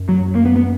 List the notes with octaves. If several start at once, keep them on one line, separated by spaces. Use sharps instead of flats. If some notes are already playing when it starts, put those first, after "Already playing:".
Already playing: F#2
F#3
A#3
B3
B3